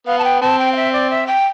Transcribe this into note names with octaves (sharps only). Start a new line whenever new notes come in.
B3 F5
A5
G5
C4 A5
G5
F5
E5
D5
E5
G5